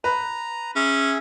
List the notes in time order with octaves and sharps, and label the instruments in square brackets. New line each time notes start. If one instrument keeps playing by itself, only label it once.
[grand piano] B4 [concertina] A#5
[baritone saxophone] C#4 [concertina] G#4 E5